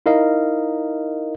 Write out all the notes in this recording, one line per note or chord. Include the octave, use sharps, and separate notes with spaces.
D#4 E4 A#4 D#5 F5